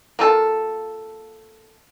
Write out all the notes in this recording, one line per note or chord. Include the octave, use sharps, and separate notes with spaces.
A#3 F4 A4